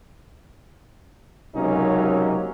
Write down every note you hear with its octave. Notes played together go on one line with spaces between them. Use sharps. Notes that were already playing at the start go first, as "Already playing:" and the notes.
C#2 C3 F#3 A#3 C#4 D#4